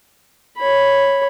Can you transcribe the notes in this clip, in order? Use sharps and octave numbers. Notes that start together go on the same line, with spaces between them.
C#5 B5